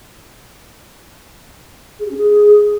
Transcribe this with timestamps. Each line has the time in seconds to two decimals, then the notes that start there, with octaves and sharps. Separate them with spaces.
1.99 G#4
2.05 G4
2.11 C#4
2.17 G#4